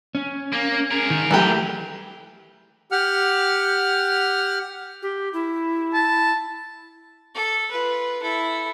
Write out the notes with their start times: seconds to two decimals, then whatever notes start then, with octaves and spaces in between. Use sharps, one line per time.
0.15 C#4
0.53 A#3
0.91 G#4 A#4
1.10 D#3
1.31 E3 F#3 G3 A3 G4
2.92 G4 F#5 F6
5.02 G4
5.33 E4
5.94 A5
7.35 A4
7.71 F4 B4
8.22 E4 A4